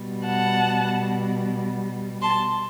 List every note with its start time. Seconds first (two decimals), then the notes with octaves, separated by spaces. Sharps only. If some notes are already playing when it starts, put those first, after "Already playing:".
Already playing: B2 G3
0.26 F#5 A5
2.21 A5 C6